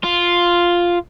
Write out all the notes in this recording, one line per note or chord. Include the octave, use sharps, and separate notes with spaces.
F4